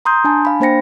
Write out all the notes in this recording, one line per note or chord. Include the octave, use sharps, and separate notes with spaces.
A#5 C6 D#6 G6
D4 G#5 A5
F5 B5
A#3 D4 C5 G5 A#6 C#7